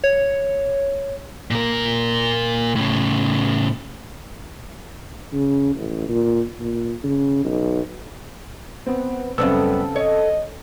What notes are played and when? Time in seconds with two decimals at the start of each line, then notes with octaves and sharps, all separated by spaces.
0.04 C#5
1.51 A#2 A#4
2.75 A2 C#3
5.33 C#3
5.76 A1
6.09 A#2
6.60 A#2
7.04 C#3
7.45 B1
8.86 B3 C4
9.38 F#2 C#3 G3 B3 C4 A4 E6
9.96 C#5 D#5